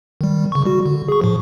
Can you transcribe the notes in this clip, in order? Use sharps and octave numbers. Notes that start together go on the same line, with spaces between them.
D#3 G3
C#3 C#6
G3 F#4
D3
G#4 C#6
A2 F3